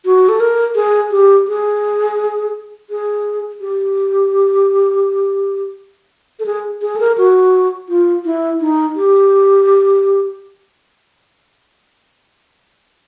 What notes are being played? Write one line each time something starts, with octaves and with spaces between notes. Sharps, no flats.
F#4
A4
A#4
G#4
G4
G#4
G#4
G4
A4
G#4
G#4
A4
A#4
F#4
F4
E4
D#4
G4